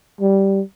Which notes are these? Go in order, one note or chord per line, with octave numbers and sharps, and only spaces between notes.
G3